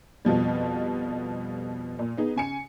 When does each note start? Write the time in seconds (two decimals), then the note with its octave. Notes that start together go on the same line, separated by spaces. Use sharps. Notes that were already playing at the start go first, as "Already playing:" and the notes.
0.25 F2 B2 F3 G3
1.99 A#2
2.18 B3 D#4 G#4
2.36 C#3 G#5 C#7